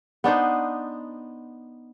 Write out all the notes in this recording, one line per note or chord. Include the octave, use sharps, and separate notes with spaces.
B3 D4 D#4 C5